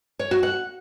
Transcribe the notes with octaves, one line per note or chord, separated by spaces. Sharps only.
C#5
F#4
F#5